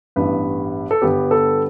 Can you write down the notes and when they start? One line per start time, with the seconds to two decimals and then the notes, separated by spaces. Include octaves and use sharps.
0.16 A1 G2 G3 B3 B4
0.91 A4
1.02 G1 G2 G3 B3 G4
1.31 A4